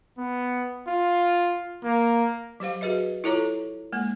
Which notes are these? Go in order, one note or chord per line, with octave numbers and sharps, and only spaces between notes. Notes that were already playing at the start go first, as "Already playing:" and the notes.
B3
F4
A#3
F#3 G4 C5 F5
F#4 G#4 B4 D#5 E5
E4 F4 A4 C#5 A#5 D6
G#3 A#3